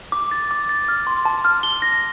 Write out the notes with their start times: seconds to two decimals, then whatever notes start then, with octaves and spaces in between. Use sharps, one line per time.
0.12 D6
0.31 A6
0.51 D6
0.69 A6
0.88 F6
1.07 C6
1.25 A5
1.45 F6
1.63 G7
1.82 A#6